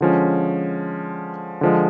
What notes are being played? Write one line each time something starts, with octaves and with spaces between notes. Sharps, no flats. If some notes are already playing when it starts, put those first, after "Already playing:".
D3 F3 G#3 C#4
D3 F3 G#3